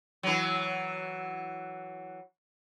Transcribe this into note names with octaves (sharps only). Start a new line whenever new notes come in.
E3 F#3